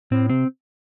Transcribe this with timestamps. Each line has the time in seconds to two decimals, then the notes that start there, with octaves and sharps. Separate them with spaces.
0.11 A2 C4
0.30 C3 C4